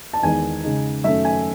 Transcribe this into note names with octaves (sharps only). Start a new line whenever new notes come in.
A5
E2 D#3 G#3 D#4 G#5
C#3 G#3 D#4
F#2 D#3 A3 C#4 E5
G#5